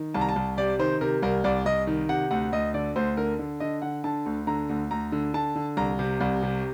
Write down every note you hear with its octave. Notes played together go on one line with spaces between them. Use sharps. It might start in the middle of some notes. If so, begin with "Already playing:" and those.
Already playing: D#3
C2 A5
A#5
A5
C2
C3 D5
D#3 C5
C3 A#4
C2 A#4
C2 D5
C2 D#5
D#3
C3 F#5
D2 F#5
D2 D#5
D3 D5
D2 C5
D3 A#4
D3
D3 D#5
D3 F#5
D3 A5
D2
D3 A#5
D2
D2 A#5
D3
D3 A5
D3
C2 A#5
C3
C2
C3